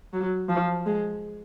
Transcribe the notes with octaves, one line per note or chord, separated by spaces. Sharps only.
F#3
F3
G#3